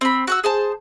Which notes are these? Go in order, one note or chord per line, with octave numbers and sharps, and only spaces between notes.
C4 B5
F#4 F#5 E6
G#4 C5 A5